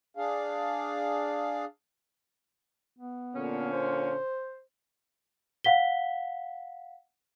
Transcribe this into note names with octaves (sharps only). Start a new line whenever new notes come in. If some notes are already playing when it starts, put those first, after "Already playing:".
D4 G#4 F5
B3
A#2 D3 C#4
C5
F5 F#5 B6 G7